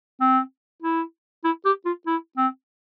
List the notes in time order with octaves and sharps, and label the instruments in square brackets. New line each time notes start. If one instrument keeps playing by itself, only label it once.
[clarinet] C4
E4
E4
G4
F4
E4
C4